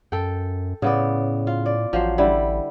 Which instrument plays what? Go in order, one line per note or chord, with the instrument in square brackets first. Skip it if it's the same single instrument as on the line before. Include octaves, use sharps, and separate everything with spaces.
[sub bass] F#2 [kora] A4 G5
[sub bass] A2 [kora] C#3 B3 D5
[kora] F4
D5
[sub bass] A1 [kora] F3 F#3 C5
[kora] D3 G3 E4